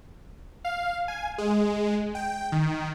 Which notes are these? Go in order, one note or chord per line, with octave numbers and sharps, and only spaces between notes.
F5
G#5
G#3
G5
D#3